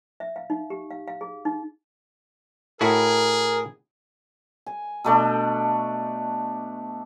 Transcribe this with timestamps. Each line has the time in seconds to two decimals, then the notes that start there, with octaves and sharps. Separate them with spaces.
0.20 E5
0.36 F5
0.50 D#4
0.70 G4
0.90 F5
1.08 F5
1.21 G#4
1.45 D#4
2.81 A2 E4 F#4 G#4 A#4
4.66 G#5
5.04 B2 A3 D4